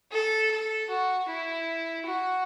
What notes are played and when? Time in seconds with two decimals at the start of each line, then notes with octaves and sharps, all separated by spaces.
0.12 A4
0.51 A4
0.90 F#4
1.29 E4
2.07 F#4